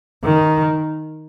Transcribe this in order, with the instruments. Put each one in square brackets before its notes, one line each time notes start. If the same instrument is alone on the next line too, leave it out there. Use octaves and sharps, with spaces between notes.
[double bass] D#3